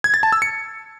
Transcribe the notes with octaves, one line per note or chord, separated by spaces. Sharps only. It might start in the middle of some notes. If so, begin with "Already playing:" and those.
G#6
A6
A5
E6
C#7